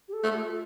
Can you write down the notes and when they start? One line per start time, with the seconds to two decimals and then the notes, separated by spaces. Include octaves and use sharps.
0.08 G4
0.13 A4
0.24 A3
0.35 F4